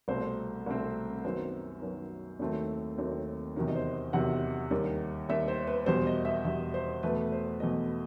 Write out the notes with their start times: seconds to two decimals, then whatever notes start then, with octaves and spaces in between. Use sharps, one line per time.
0.08 C2 B2 A3 C4 C5
0.66 C2 B2 A3 C4
1.24 F#2 D#3 F#3 B3 C5
1.82 F#2 D#3 F#3 B3
2.39 D#2 D#3 F#3 A3 C4
2.98 D#2 D#3 F#3 A3 C4
3.56 E2 C3 D#3 F#3
3.68 D#5
3.75 C5
4.13 E2 C3 D#3 F#3 F#5
4.71 D#2 D#3 G3
5.29 D#2 D#3 G3 E5
5.48 C5
5.67 B4
5.86 E2 B2 G3 C5
6.07 D#5
6.25 E5
6.45 E2 B2 G3 E5
6.74 C5
7.03 E2 B2 A3 B4
7.32 C5
7.60 E2 B2 A3 D#5